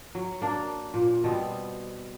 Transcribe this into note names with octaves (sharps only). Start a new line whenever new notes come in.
F#3
A#3 D4
A#2
B2 G3 B3 C4